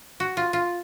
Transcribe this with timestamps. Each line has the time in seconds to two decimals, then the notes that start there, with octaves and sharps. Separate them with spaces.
0.20 F#4
0.37 F4
0.53 F4